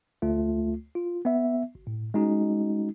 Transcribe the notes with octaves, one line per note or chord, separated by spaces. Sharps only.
D2 A3 F4
F4
B3 E5
G#1
A2
G#3 C#4 D#4 F#4